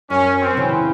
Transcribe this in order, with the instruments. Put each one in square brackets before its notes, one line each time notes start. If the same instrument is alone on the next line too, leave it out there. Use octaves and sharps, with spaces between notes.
[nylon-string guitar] F#2 [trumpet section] C#4
[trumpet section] C4
[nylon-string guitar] C#3 E3